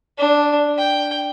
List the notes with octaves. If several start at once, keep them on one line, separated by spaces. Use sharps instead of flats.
D4
G5